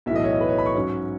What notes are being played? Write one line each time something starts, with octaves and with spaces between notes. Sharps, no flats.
B1 A2 E3 E5
D#5
C#5
D#5
B4
C#5
B5
C#6
G#2 F#3 C#4